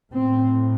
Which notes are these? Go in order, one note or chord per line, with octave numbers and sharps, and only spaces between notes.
A2 C4